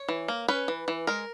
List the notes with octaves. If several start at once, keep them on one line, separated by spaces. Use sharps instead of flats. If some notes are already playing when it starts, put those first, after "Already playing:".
Already playing: C#5
E3
A#3
C#4 B4
E3
E3
G#3 A#4